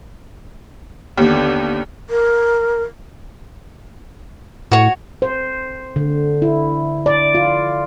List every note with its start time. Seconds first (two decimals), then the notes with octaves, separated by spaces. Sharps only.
1.18 D#2 D3 B3 G4
2.10 A#4
4.72 A2 F#4 C#5
5.22 C5
5.96 D3
6.42 E4
7.06 D5
7.35 F4